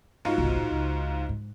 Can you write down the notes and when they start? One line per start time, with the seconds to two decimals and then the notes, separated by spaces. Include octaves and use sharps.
0.25 G#2 G#3 F4 F#4
0.38 G1 C2
0.56 F#2 A#2
0.71 C#2
1.29 G#2